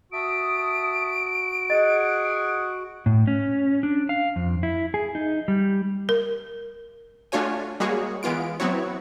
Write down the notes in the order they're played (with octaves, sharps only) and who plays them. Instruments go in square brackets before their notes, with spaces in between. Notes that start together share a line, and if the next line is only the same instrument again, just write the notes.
[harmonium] F#4 [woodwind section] E5 A5 D#6 [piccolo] D7
[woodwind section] G#4 F#5 [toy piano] D#5
[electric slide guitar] A2
C#4
D4
F5
F2
E4
G#4
D#4
G3
[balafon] A#4
[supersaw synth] A3 D4 F4 F#4 C#5 G#5
G3 G#3 A#3 F#4 G#4 C#5
E3 G#3 B3 F4 D7
F#3 B3 C4 E4 F#4 C#5